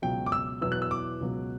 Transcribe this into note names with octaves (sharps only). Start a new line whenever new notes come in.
C#2 B2 F#3 G5
D6
E6
E2 B2 F#3 B3 E4 E6
F#6
E6
D6
C#2 B2 F#3